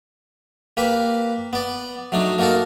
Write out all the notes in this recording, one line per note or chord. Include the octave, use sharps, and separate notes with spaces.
A#3 G4 B4 B5
B3 D5
F#3 A3 D4 D#4
A#3 D#4 F#4 A4 A#4